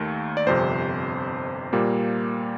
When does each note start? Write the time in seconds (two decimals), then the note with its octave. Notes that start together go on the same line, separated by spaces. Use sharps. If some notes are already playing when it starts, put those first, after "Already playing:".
Already playing: D#2 D#3 A3
0.37 D5
0.46 G1 F2 C3 C5
1.73 A#2 G3 A#3